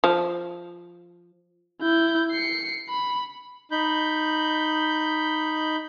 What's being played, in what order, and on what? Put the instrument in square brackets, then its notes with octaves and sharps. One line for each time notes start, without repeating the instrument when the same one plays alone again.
[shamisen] F3
[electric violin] E4 G6
C7 C#7
B5
[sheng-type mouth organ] D#4 B5 G6